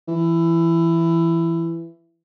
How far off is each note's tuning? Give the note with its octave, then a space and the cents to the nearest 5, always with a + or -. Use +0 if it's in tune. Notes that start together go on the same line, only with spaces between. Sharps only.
E3 +15